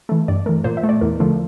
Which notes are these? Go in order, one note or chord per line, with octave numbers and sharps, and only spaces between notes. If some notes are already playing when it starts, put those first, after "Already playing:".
E3 A3
G2 D5
E3 A3 A#4
A#2 C5
E5
A3
D5
E2 A#4
D3 F3 A3